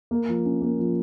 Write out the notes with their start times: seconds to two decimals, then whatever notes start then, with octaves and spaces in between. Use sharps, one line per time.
0.11 A#3
0.28 F3
0.45 C#4
0.62 A#3
0.79 F3